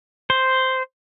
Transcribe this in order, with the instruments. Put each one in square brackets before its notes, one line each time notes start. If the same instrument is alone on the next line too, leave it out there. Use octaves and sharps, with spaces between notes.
[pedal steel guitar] C5